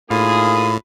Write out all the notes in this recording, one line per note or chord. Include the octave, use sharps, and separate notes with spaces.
A2 A#3 D#4 F4 G#4 B5